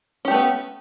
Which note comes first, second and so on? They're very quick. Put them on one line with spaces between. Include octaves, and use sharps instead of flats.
C#4 G4 A3 B3